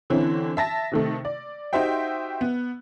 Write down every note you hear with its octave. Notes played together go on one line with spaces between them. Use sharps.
D3 E3 C4 C#4 E4
E5 A5 A#6
C3 D#3 A3
D5
D#4 F#4 G4 C5 E5 G5
B3